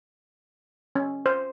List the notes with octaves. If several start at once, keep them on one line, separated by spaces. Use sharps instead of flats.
C#4
C5